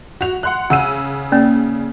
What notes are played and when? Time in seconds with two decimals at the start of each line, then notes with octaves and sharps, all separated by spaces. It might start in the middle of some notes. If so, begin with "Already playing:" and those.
0.21 F#4 F7
0.43 F#5 C6 F#6
0.70 C#3 F#5 E6 D#7
1.32 A#3 C#4 D5